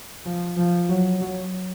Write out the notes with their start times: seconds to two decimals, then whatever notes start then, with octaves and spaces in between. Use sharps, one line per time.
0.26 F3
0.57 F3
0.89 F#3
1.21 F#3